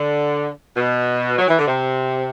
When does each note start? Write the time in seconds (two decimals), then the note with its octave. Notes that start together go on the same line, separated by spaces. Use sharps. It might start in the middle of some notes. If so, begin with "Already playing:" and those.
Already playing: D3
0.76 B2
1.38 F#3
1.48 E3
1.58 D3
1.67 C3